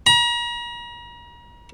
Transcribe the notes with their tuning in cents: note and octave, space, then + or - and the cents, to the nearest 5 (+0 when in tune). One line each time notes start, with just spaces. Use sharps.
A#5 +40